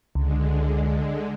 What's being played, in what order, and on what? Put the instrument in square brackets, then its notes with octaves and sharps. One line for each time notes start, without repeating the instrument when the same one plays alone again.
[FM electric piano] C#2 [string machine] D3 G#3